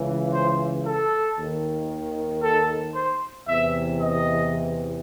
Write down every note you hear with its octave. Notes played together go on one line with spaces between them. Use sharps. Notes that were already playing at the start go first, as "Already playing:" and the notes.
Already playing: C#2 C#3 E3
C5
A4
D#2 D#3
A4
C5
E2 C3 E3 E5
D#5